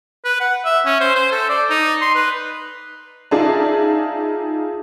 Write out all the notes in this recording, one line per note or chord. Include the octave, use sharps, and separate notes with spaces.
B4
F#5
E5
C#4
C5
C5
A4
D5
D#4
C6
B4
D#4 F4 G#4 D5 E5 A5